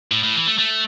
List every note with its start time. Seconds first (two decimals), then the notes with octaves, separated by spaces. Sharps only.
0.11 A2
0.23 A2
0.35 E3
0.47 A3
0.58 A3